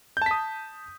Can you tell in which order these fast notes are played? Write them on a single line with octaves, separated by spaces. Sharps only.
G6 A5 B6 D#6